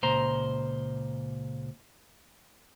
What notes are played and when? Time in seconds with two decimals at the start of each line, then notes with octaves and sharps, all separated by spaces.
0.03 C#2 A#2 C5 A#5